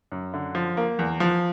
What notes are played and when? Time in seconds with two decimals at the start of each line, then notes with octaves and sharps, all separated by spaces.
0.12 F#2
0.34 D3
0.55 F3
0.77 A#3
0.99 E2
1.20 F3